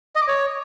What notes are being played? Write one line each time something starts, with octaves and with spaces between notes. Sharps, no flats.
D#5
D6
C#5